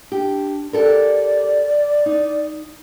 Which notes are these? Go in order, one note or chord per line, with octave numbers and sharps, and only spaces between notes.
D4 G4
G4 A4 A#4 D5
D#4